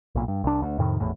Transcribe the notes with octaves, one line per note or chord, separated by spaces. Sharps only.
B1 A#2
G2
C2 D4
D2
F2 A2 C3 D#3
G#1 E2 A2